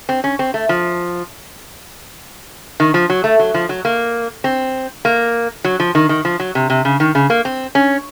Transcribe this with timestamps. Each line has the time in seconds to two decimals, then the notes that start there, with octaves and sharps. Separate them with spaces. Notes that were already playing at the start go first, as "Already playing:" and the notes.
0.09 C4
0.24 C#4
0.39 C4
0.54 A3
0.69 F3
2.80 D#3
2.94 F3
3.10 F#3
3.24 A3
3.39 F#3
3.54 F3
3.69 F#3
3.85 A#3
4.44 C4
5.05 A#3
5.64 F#3
5.80 F3
5.95 D#3
6.09 D#3
6.25 F3
6.40 F#3
6.55 C3
6.70 C3
6.85 C#3
7.00 D#3
7.15 C#3
7.30 A#3
7.45 C4
7.75 C#4